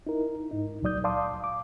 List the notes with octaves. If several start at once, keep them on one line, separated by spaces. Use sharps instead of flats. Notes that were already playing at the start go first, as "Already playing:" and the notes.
D#4 E4 A#4
G#2 D#4
C#2 A#2 F#3 D5 D#6 G6
D5 F5 A5 C6 D6 D#6
D6